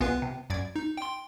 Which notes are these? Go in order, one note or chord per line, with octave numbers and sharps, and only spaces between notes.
C2 G#3 B3 F4 B4
C3
F#2 D5 G#6
D#4
G5 C6